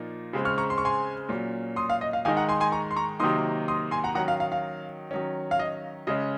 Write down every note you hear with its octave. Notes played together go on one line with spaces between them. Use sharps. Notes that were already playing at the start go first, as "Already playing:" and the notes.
Already playing: A#2 F3 A#3 D#4
C#3 G#3 C4
C#6 F6
A#5 C#6
C6
C#6
G#5 C6
A#2 F#3 C#4
C6 D#6
F5
D#5
F5
G#2 D#3 G#3 D#4 F5 G#5
F#5 A#5
G#5 C6
G#5 C6
A#5 C#6
C6
A#5 C#6
C3 D#3 F#3 A#3 D#4 C6 D#6
C6 D#6
G#5 C6
F#5 A#5
D#3 F#3 C#4 F#5 A#5
F5
F5
F5
D#3 F#3 C#4
F5
D#5
C#3 G#3 C#4 D#5